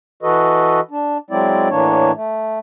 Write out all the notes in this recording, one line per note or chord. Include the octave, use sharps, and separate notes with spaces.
E3 F#4 A4 B4 D#5
D4
F#3 G#3 C4 E4 D5
A2 E3 A#3 D4 C#5
A3